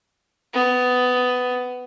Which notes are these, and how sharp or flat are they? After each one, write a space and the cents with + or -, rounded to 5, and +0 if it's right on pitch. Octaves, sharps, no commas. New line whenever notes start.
B3 +15